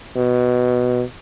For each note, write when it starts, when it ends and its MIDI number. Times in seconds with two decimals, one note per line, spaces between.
0.16 1.02 47